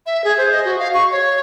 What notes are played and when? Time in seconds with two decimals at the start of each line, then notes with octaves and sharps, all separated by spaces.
0.06 E5
0.24 G#4
0.38 C5
0.52 D#5
0.65 F#4
0.79 F5
0.94 C#6
1.12 C#5